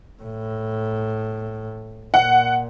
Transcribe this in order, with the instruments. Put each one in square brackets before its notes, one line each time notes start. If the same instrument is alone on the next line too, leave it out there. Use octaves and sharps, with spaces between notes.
[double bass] A2
[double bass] A#2 [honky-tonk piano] F#5